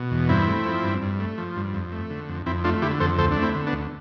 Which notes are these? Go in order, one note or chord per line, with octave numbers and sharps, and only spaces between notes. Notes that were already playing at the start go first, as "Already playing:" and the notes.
Already playing: B2
E2
G2 C4 E4
A3
F3
G2
G2
A3
F3
G2
F2
A3
D3
F2
F2 C4 E4
A3 D4 F4
D3 E4 G4
F2 A4 C5
D2 A4 C5
D4
A3
C4 E4
D3
B3 D4
D2